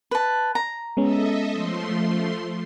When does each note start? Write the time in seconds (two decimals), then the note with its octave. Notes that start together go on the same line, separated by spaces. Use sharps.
0.11 B4 A5
0.55 A#5
0.97 G#3 B3 C#4 A4 D#5 E5
1.51 F3 A3 C6